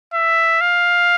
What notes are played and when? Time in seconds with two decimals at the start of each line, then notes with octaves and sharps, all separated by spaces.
0.13 E5
0.61 F5